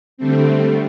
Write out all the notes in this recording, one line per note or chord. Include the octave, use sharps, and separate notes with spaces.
D3 G3 A3 C4